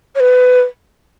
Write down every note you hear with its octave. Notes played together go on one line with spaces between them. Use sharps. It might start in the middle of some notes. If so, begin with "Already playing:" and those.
C#5
B4